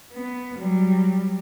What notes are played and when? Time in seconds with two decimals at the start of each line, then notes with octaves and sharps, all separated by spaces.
0.14 B3
0.58 F#3 G3